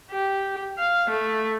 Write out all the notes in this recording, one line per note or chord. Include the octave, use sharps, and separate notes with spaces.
G4
F5
A3